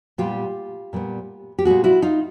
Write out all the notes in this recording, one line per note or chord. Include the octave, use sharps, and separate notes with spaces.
A#2 G3 B3 F4 G4
A#2 G3 B3
G4
A#2 G3 B3 F#4 G#4
E4 F#4
D#4 F4